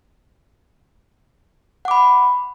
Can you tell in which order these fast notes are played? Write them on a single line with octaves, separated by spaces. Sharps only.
F#5 D6 B5